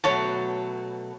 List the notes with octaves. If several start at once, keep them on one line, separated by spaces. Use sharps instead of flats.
B2 F#3 A3 C#5 A5